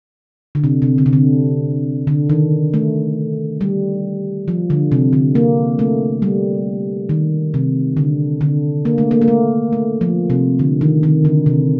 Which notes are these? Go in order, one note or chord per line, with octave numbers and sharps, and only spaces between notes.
D3
C3
C3
D3
C3
D3
D3
D#3
A3
G3
F3
D3
C3
D3
A#3
A3
G3
D#3
C3
D3
D3
A#3
A3
A#3
A#3
A3
A3
F3
C3
D3
D#3
D#3
D3
C3